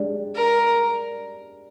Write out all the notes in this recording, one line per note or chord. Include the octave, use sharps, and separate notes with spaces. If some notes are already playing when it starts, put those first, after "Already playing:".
Already playing: G#3 D4 G4 D5
A#4